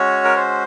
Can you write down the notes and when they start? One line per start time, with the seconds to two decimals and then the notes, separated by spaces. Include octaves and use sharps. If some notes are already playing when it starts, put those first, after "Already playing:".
Already playing: G#3 C#4 F#4 C#5
0.25 A#4
0.36 C5